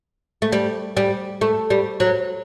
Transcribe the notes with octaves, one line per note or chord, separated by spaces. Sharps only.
A3
G3
G3
A3
G3
F#3